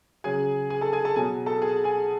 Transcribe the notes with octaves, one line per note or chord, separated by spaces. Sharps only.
C#3 F#3 G#4 G#5
G#4 G#5
A4 A5
G#4 G#5
A4 A5
B2 F#3 G#4 G#5
A4 A5
G#4 G#5
G#4 G#5